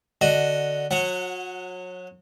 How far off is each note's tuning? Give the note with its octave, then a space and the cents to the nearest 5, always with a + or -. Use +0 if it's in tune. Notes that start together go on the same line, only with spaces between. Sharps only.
D3 +0 F#4 +0 D#5 +0
F#3 -30 F#5 +0